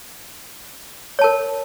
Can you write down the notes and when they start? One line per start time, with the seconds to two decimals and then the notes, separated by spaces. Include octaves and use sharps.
1.19 C#5
1.21 A5
1.24 A#4